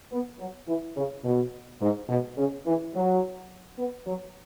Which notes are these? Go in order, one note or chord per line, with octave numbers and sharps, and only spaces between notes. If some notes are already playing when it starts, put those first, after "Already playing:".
B3
F#3
E3
C#3
B2
G#2
B2
C#3
E3
F#3
B3
F#3